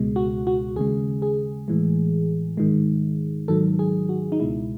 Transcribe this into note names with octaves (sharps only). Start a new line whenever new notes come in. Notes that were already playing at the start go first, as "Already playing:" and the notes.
Already playing: C#2 B2 G#3
F#4
F#4
D#2 C#3 G#3 G#4
G#4
A2 E3 G#3
G#2 D#3 G#3
G#2 D#3 F#3 A4
G#4
F#4
D#4
C#2 B2 G#3 E4